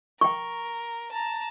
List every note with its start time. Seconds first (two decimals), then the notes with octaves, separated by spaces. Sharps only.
0.21 A#4 G5 C#6
1.12 A5 A#5